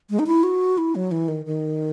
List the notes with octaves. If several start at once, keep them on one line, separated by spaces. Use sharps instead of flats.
G#3
D#4
E4
F#4
E4
F#3
E3
D#3
D#3